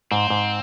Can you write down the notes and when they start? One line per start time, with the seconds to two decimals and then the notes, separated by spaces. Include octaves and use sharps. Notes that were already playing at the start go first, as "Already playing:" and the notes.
0.12 G#2 C4
0.30 G#2